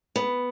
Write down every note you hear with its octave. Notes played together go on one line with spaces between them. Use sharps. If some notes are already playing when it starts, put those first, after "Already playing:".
B3